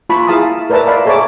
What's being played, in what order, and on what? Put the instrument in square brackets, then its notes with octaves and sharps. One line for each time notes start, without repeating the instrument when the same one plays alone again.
[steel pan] F4 A5 B5 C#6
E4 G#4 F5 A5 A#5 D#6
A#4 B4 D5 E5 A5 A#5
D5 D#5 F5 B5
G#4 A4 C#5 E5 A#5 D6